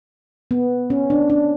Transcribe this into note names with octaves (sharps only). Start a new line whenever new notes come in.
B3
C#4
D4
D4